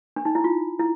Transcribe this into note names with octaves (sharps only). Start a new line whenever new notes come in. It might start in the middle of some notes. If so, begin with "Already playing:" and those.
D4
D#4
E4
F4
E4